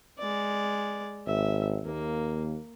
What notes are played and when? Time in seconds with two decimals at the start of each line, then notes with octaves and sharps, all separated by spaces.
0.18 G#3 D5
1.27 G#1 E5
1.85 D#2 A#3